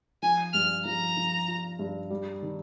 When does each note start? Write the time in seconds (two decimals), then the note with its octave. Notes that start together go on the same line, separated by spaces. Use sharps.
0.22 F3 G#5
0.53 G2 F6
0.85 F3 A#5
1.17 F3
1.48 F4
1.79 G2
2.10 G3
2.42 D#3